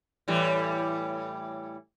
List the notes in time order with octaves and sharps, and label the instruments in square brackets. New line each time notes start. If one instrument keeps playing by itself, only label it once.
[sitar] A2 E3 G3